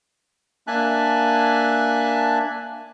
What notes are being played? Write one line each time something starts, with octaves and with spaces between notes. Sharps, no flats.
A#3 D4 E5 G#5 A5 F#6